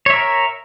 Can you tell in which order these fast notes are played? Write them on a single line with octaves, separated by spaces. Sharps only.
C#5 E5 A#4